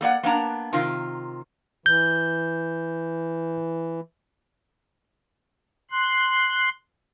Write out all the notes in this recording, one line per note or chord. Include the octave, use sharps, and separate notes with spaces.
A3 A#3 D5 F#5
A#3 B3 D4 A#5
C3 D#3 F4
E3 G6
C6 F#6